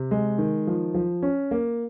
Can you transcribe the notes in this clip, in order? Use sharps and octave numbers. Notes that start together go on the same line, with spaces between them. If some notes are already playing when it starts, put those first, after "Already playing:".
Already playing: C3
G#3
D#3
F3
F3
C#4
A#3